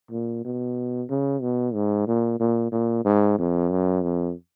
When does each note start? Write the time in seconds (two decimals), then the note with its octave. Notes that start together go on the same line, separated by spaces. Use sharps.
0.11 A#2
0.45 B2
1.10 C#3
1.41 B2
1.74 G#2
2.07 A#2
2.40 A#2
2.72 A#2
3.05 G#2
3.38 F2
3.70 F#2
4.03 F2